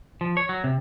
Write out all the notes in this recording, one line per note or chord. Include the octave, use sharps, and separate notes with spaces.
F3
C#5
F#3
C3